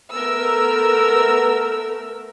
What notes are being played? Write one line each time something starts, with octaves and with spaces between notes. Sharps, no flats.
A3 B3 A#4 E6